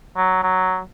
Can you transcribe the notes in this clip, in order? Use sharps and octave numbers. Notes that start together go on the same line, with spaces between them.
F#3
F#3